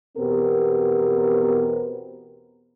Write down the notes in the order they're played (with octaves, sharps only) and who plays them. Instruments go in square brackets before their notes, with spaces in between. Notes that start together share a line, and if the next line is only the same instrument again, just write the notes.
[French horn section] E2 B2 B3 C4 G4 A#4